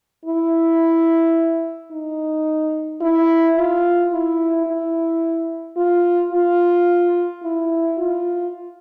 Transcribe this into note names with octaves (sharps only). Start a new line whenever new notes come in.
E4
D#4
E4
F4
E4
E4
F4
F4
E4
F4